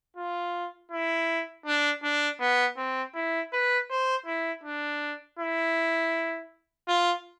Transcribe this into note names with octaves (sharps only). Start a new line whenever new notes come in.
F4
E4
D4
D4
B3
C4
E4
B4
C5
E4
D4
E4
F4